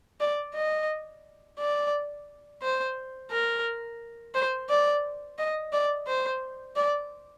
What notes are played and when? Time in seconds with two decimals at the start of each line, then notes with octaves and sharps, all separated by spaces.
0.21 D5
0.55 D#5
1.59 D5
2.63 C5
3.31 A#4
4.35 C5
4.69 D5
5.38 D#5
5.73 D5
6.07 C5
6.76 D5